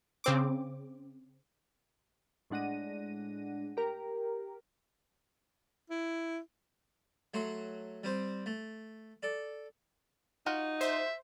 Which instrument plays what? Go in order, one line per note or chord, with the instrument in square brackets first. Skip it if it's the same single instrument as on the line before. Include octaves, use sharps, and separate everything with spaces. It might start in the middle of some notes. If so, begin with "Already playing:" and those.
[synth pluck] C#3 C4 D6
[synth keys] A2 G#3 D4 F#5 A#6 D#7
G4 A#4
[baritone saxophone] E4
[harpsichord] F#3 A3 F#4 C6
G3 C4 C5
A3
A4 D5
[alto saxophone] D#4 [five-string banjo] F4 F#4 F#5
[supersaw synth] C5 [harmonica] E5